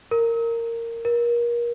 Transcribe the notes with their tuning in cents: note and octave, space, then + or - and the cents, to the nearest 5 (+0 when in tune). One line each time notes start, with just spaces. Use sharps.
A#4 -15
A#4 +30